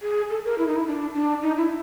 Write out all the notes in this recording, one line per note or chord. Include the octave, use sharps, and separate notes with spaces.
G#4
A4
A#4
E4
D#4
E4
D4
D4
D#4
E4